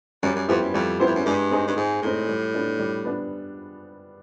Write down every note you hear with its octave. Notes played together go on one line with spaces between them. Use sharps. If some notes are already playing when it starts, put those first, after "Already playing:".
F#2 G3
F#2
F2 B3 E4 G4 C5
F#2
F2 G3
F#2 B3 E4 G4 C5
F2
F#2
G2 G#3
C4 D#4 G#4
G2
G#2 G#3
A2 C4 D#4 G#4
G3
B3 D4
G3
B3 D4